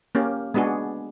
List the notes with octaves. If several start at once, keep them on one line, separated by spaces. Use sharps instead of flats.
A#3 C#4 G4
G#3 B3 D4 F#4 G#4